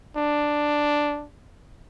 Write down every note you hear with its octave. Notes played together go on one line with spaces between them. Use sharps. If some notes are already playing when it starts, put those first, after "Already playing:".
D4